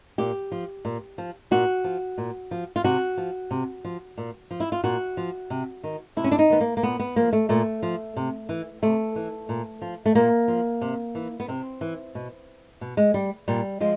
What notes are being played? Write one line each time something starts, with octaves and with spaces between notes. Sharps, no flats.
A#2 G4
F3
A#2
F3
A#2 F#4
F3
A#2
F3
F4
C3 F#4
F3
C3
F3
A#2
F3
E4
F4
A#2 F#4
F3
C3
D#3
C3 E4
C#4
D4
D#4
D#3 B3
A#3
A#3
A#2 B3
B3
F3 A#3
A3
A#2 A3
F3
C3
E3
C3 A3
E3
A#2
F3
A3
A#2 A#3
F3
C3
E3
B3
C3 C4
E3
B2
B2
G#3
G3
A#2 G3
F3 G#3